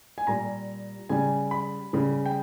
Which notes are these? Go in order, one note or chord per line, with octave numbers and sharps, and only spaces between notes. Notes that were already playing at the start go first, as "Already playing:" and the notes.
G#5
A#2 G3 A#5
C#3 G3 G#5
B5
C#3 G3
G5